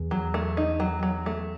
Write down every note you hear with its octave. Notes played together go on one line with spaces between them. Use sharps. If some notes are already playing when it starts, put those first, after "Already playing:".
Already playing: E2
F#3
A3
D#4
F#3
F#3
A3